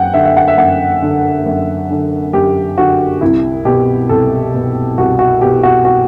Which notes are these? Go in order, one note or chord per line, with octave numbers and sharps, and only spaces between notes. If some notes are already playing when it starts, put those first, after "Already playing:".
Already playing: F#2 F#5 G5
D3 E5
E5
F#5
E5
F#2 F#5
D3
F#2
D3
F#2 G4
D3 F#4
C2 E4
B2 G4
C2 A4
B2
C2 F#4
F#4
B2 G4
F#4
F#4